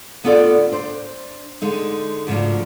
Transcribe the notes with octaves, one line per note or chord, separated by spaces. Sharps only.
D2 B3 D4 F4 A4 D5
D4 C5
D3 G#3 D#4
D2 G#2 C#3 F3 D4